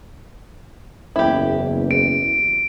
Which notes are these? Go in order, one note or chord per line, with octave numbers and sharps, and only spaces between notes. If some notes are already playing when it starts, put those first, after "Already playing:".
F#1 E2 E4 G4
D7